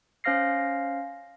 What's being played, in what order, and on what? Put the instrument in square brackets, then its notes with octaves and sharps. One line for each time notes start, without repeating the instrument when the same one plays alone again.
[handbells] C#4 C5 F5 F6 A#6 C7